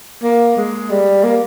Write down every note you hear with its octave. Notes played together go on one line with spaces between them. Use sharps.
A#3
G#3
G3
A#3